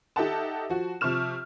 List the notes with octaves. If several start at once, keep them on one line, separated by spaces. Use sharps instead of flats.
D#4 G4 A4 E5 F#5 A5
F3 F#4
C3 F3 C#6 F6 E7